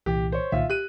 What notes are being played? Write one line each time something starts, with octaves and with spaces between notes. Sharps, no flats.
C2 A#2 E3 G4
C5 C#5
C2 A#2 D#3 F4 E5
G4 F#6 D#7